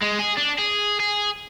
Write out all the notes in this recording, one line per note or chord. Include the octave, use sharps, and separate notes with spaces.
G#3
G#4
D4
G#4
G#4